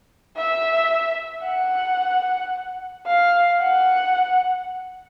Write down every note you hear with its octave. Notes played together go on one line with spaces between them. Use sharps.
E5
F#5
F5
F#5